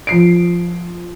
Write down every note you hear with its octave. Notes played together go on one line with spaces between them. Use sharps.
F3 C7 D7